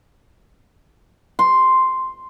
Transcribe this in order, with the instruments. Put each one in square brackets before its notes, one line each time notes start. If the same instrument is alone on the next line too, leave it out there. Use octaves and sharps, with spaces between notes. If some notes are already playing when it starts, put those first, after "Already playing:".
[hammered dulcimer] C6